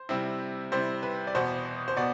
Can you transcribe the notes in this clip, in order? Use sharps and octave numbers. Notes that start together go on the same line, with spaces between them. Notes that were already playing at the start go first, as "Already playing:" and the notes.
Already playing: C5
C3 G3 C4 E4
C3 G3 C4 E4 C5
B4
D5
E2 B2 B3 C5
C5
B2 B3 D5